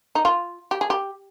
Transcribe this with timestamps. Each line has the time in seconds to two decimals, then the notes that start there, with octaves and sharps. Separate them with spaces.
0.15 D#4
0.25 F4
0.71 G4
0.81 G#4
0.90 G4